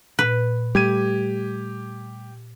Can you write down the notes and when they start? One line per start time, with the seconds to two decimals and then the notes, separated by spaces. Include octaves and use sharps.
0.19 A#2 B4
0.75 G3 A3 G4 G#6 D#7